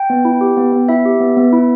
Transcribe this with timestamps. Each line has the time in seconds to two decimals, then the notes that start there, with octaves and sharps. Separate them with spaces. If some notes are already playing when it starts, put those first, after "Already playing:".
Already playing: G5
0.10 B3
0.25 E4
0.41 G4
0.57 B3
0.72 B3
0.89 E4 E5
1.05 G4
1.20 B3
1.37 B3
1.53 E4